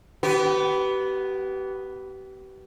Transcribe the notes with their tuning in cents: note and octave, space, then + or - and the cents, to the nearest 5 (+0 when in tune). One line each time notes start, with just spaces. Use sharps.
B3 +0 G4 -35 B4 +0